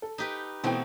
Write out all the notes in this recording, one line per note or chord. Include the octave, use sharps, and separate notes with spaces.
A4
D#4 G4 B4
B2 E3 A3 C4 G5